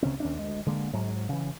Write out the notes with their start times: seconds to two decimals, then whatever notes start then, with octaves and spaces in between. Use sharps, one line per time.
0.03 C#2 C#3 C4 C#4
0.20 D#2 C#4 D4
0.39 D2 G#3
0.66 D3 G#3 A#3
0.93 G#2 F#3
1.29 C#3 E3